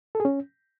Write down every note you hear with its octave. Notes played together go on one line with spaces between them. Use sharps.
A4
G#4
C#4